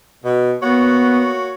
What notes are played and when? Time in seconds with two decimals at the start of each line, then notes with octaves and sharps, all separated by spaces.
0.24 B2
0.62 A#3 B3 F#4 C#5